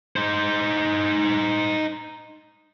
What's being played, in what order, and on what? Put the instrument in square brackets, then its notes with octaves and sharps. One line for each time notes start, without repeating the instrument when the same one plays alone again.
[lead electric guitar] D#4 C5